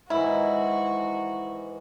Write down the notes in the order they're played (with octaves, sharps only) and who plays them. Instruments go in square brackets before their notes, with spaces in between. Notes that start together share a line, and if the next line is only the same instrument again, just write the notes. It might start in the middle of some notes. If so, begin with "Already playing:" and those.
[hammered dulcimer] G#2 D#3 E3 [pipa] E4 [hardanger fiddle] F#4